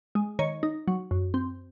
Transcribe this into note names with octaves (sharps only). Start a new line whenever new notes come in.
G#3
D#3 C#5
D#4
F#3
F#2
C4